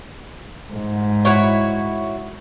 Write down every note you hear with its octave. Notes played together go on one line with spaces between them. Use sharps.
G#2
E4 F#4 C#5